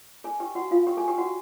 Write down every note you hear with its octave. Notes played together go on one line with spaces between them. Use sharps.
G#4 G#5
G4 G5
F#4 F#5
F4 F5
G4 G5
G#4 G#5
G4 G5
F#4 F#5